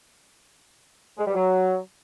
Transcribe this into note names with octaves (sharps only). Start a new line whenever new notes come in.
G#3
G3
F#3